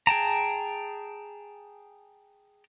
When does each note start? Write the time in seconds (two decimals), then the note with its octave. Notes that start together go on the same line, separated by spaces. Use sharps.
0.07 G#4 G5 A5 A#5